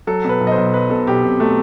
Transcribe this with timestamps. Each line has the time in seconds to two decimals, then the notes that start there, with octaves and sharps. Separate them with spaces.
0.07 F#3 A4
0.25 B2 B4
0.41 B1
0.47 D#5
0.52 C5
0.58 B1
0.74 F#3 B4
0.90 B2 A4
1.07 B1 G4
1.24 B1 C4
1.40 F#3 A3